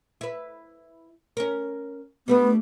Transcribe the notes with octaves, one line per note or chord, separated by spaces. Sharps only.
E4 B4
C#4 A#4
G3 A3 B3 D4